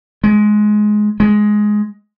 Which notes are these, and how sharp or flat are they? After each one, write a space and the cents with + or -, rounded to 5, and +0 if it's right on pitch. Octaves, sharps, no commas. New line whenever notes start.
G#3 +15
G#3 +10